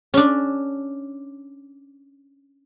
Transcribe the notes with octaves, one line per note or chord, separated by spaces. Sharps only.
C#4 D4